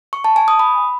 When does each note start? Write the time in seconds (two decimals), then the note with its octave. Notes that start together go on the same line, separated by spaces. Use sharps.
0.13 C#6
0.24 A5
0.36 G#5
0.48 D#6
0.59 B5